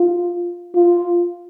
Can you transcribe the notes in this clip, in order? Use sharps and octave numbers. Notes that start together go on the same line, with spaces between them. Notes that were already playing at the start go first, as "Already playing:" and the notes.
Already playing: F4
F4